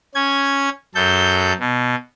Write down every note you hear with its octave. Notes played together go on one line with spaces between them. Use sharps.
C#4 G#6
F#2 A4 G6
B2